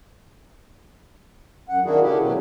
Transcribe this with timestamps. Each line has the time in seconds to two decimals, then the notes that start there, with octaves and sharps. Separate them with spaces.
1.69 F#2 F#5
1.85 D#3 A#3 D4 E4 F#4 G#4
2.02 C#3 A3 C#4 E4 G4
2.21 B2 F#3 C#4